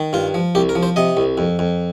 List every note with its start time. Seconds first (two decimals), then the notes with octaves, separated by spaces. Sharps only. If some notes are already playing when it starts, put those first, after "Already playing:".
Already playing: D#3
0.13 G2 F4
0.34 F3
0.55 C2 G4
0.69 A#4
0.75 F3
0.83 C5
0.96 C3 D#5
1.17 C2
1.38 F2
1.59 F2